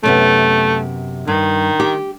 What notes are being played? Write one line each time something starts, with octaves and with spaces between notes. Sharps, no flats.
F#2 C3 A3 B3
G2 D#3
G4